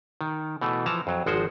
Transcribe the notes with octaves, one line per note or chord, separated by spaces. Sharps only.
D#3
B2 E3 A3
E3 F3 A5 A#5
F2 F#3
G#1 F3 G#3 F#4 C5